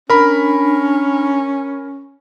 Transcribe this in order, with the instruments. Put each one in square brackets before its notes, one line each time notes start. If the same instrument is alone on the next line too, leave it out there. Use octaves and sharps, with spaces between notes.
[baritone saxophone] C#4 [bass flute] D4 [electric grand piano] A#4 B5